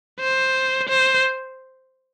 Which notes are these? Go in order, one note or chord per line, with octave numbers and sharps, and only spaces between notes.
C5
C5